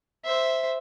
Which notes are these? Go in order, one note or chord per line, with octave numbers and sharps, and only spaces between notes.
C5 E5